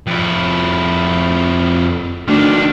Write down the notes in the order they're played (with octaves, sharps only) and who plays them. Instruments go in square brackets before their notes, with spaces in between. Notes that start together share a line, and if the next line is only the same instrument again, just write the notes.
[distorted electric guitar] F2 E4
[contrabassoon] D2 [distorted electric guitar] D#3 D4